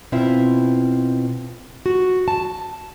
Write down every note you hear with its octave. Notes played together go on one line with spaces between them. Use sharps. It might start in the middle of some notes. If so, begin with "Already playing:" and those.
B2 C4 E4 F4 E5
F#4
A5